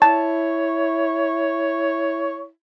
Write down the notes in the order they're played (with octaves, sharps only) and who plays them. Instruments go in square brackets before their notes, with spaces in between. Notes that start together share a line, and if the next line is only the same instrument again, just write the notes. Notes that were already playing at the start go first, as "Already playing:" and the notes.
[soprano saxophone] E4 [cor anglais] C#5 [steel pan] A5